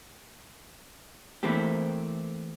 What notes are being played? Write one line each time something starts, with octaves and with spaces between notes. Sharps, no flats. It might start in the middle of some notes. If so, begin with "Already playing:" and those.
E3 A3 A#3 C4 G4